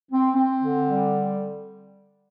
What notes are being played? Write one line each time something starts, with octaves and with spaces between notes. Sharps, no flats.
C4
C4
D3
G3